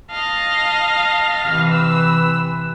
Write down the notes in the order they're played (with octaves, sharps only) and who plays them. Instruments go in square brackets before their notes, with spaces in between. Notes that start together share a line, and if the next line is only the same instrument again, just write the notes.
[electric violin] D#5 F5 [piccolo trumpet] A5
[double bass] C3 E3 [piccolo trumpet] F6
[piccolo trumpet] B4 [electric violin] E6